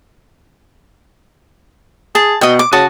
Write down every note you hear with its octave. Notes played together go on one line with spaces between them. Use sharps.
G#4 A5
B2 D#5 G5
D6
C#3 F#4 A5 D#6